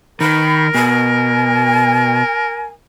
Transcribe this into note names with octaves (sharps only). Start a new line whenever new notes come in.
D#3 A#4 B5
B2 G#5